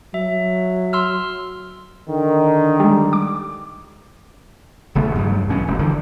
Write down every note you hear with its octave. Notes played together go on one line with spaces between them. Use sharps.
F#3 E5
C6 E6 F6
D3 D#3
G3 G#3
D6
D#1 C#3 A3 B3
G2 F#3 G3 A3
B1 B2 E3 C#4
E1
D3 E3 F3 G3